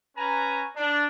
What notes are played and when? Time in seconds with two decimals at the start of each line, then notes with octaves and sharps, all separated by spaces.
0.17 C#4 B4 G#5 A#5
0.76 D4